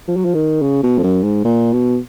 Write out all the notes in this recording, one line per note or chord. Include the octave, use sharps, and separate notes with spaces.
F3
F#3
F3
D#3
C#3
B2
F2
F#2
G#2
A#2
B2